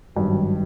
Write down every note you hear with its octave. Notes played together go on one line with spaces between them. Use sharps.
G#1 G2 D#3 F#3